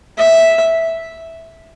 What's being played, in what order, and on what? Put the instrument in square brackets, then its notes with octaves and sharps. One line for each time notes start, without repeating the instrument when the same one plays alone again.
[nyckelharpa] E5